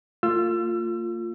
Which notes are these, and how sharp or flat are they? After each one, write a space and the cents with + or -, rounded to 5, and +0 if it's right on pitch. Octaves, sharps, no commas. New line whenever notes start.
A#3 -45 F4 +5 E6 +35